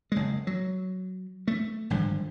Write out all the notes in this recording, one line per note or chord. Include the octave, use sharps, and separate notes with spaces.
F#1 G#3
F#3
A3
G#1 G2 D3 F3